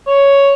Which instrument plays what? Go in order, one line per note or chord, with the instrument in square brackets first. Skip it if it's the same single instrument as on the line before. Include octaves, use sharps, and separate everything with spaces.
[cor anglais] C#5